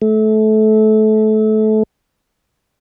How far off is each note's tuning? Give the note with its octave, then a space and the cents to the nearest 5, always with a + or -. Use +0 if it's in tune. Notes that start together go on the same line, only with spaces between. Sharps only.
A3 -25